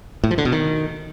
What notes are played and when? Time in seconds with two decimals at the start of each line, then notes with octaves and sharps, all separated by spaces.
0.24 A2
0.31 F3
0.38 D3
0.45 B2
0.52 D#3